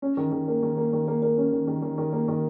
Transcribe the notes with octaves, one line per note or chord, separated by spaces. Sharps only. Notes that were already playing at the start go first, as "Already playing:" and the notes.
C#4
D#3
D#3
A#3
D#3
A#3
D#3
A#3
A#3
C#4
D#3
D#3
D#3
D#3
A#3
D#3